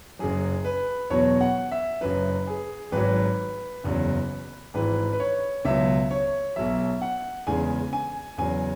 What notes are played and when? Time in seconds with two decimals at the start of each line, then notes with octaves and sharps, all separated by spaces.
0.19 F#1 F#2 F#3 G#4
0.65 B4
1.10 E2 B2 F#3 C#5
1.41 F#5
1.71 E5
2.01 F#1 F#2 F#3 B4
2.47 G#4
2.92 G#1 G#2 F#3 B4
3.84 F#1 E2 C#3 F#3
4.74 G#1 G#2 E3 B4
5.13 B4
5.20 C#5
5.65 C#2 B2 F#3 E5
6.11 C#5
6.56 B1 B2 F#3 E5
7.02 F#5
7.47 E2 C#3 G#3 G#5
7.93 G#5
8.38 E2 C#3 F#3 G#5